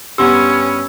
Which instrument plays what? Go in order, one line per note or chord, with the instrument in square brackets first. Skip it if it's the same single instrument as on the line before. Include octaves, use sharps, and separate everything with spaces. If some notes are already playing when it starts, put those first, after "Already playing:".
[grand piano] G2 B3 C6 [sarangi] C#4 [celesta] G4 [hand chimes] E6